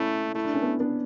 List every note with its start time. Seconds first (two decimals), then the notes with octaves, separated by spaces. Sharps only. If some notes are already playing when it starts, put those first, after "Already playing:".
Already playing: A3 C#4 E4
0.35 A3 E4
0.45 D4
0.54 C#4
0.62 B3 D4
0.80 B3 D4